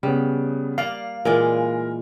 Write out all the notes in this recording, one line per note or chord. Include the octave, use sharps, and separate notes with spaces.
C#3 G3 B3
A#3 D5 F5 F6 C7
A#2 E3 G#3 A#4 D5